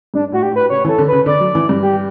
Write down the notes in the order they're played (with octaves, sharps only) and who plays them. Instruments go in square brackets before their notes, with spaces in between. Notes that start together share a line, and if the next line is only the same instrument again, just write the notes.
[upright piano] G2 [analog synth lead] D4
[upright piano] A2 [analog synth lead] F#4
[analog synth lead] G4
[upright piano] A2
[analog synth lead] B4
[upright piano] C#3 [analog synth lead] C#5
[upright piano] E3
[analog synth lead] A4
[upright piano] D3
[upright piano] C#3 [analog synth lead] B4
[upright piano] D3 [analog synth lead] D5
[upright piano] F#3
E3
G2
[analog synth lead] G4